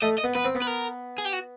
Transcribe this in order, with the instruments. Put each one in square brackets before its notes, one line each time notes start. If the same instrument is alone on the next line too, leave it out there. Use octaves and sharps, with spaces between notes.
[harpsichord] A3 [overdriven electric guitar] D#5
[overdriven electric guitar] D#5
[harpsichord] B3
[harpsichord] B3 [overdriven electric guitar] B4
[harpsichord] C4
B3
[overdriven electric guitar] B4
A#4
G#4
G4
F#4